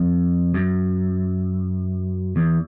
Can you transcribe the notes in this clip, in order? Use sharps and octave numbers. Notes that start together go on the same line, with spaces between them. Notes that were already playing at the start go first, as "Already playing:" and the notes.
Already playing: F2
F#2
E2